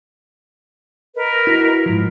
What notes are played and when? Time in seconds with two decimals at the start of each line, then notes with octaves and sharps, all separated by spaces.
1.16 A#4 B4 D#5
1.47 E4 F#4
1.86 G#2 F3